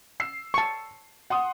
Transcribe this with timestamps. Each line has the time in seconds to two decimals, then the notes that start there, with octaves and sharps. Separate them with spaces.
0.20 E6 C7
0.54 A5 C#6
1.30 F#5 C6 D#6